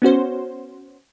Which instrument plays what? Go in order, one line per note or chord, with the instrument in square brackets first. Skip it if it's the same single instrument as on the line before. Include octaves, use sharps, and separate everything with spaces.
[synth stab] B3 C#4 F#4 C5